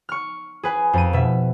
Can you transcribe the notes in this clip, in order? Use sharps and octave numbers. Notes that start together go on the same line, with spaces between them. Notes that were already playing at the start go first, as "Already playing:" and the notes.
C#6 F6
G#4 B4 G#5
F2 D#7
B2 E5